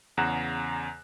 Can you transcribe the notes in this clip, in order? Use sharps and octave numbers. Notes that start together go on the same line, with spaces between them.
E2 C#3 F#5 A#5 F#6 E7